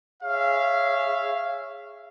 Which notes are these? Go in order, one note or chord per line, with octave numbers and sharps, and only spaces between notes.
G#4 C#5 E5 F5